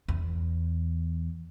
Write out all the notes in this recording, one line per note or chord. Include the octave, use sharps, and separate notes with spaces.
E2